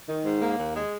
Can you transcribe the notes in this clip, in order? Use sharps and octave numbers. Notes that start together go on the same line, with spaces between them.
D#3
G#2
A#3
D#2
G#3